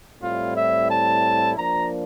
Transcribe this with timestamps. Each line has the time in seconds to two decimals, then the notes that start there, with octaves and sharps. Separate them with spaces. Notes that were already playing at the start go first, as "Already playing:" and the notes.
0.20 A2 G3 C4 E4 F4
0.54 E5
0.88 A5
1.56 F3 A#3 D4 A#5